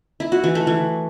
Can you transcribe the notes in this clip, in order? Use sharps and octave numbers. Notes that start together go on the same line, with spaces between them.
E4
F#4
E3
A3
E3